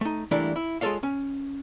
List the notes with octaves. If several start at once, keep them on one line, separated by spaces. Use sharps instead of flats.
A3 D#4
E3 G3 A3 A#3 D4 E4
E4
G#3 F4 G#4 A4 C#5 F5
C#4